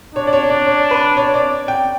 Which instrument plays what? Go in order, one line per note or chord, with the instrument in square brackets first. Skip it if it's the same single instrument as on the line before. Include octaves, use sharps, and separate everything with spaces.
[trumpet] D4 [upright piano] C#5
[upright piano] D5
C#5
D5
C#5
B4
C#5
D5
G5